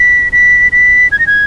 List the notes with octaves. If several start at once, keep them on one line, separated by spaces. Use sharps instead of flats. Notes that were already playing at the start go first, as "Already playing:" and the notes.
Already playing: B6
B6
B6
G#6
A#6
G#6